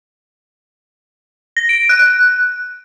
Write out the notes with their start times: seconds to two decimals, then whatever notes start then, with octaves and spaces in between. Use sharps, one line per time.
1.57 A#6
1.69 D7
1.89 F#6